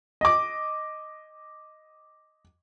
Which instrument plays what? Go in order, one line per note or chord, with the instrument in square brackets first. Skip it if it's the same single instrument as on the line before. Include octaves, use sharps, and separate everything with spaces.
[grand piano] D#5 D6